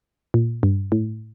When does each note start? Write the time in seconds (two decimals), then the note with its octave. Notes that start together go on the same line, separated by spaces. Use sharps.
0.34 A#2
0.63 G2
0.92 A2